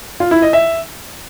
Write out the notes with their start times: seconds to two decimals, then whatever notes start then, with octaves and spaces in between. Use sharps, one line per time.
0.20 F4
0.31 E4
0.42 D#5
0.53 E5